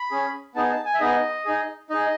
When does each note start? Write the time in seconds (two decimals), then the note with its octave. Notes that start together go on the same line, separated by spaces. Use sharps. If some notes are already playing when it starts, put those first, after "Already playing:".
Already playing: B5
0.11 C#4 G#4
0.55 B3 D#4 G#4 A5
0.70 A5
0.85 G#5
0.94 E5
1.00 B3 D#4 G#4 D#5
1.45 D#4 G#4
1.90 D#4 G#4 D#5